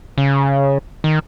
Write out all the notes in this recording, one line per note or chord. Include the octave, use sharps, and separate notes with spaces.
C#3
D#3